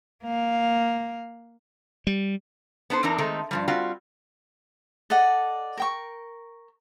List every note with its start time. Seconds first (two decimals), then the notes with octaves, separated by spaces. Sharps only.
0.24 A#3 F5
2.07 G3
2.90 B3 D4 D#4 C5
3.03 E2 E3 C4 D4 D#4 A#4
3.18 D#3 G#3 A3 C4 D#4
3.51 G2 F3 G3
3.68 G3 C4 F4 F#4
5.10 A4 D5 D#5 F#5
5.77 A#4 G5 C#6